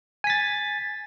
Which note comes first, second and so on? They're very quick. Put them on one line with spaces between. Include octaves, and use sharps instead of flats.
G#5 B6 A6